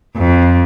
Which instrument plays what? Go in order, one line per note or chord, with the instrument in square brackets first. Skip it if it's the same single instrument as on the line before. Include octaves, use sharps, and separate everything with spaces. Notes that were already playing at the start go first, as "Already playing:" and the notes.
[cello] F2